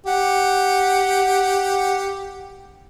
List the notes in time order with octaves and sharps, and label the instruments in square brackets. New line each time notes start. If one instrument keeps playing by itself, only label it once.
[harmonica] G4 [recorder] F#5